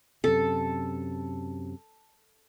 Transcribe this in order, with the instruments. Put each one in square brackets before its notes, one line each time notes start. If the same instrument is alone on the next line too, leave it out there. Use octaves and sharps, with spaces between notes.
[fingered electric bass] F#2 C3 [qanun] A4